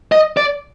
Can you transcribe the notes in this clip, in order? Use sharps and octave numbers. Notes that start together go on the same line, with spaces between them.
D#5
D5